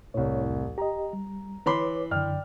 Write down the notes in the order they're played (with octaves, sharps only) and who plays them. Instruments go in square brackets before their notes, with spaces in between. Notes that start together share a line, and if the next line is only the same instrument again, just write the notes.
[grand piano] C2 A2 [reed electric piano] C#5
[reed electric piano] E2
[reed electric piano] G4 D#5 [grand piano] A#5
[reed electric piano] G3
[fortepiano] E3 B5 C6 [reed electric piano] B4 C#5 D6
[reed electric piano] F#2 D3 [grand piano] D5 G5 F6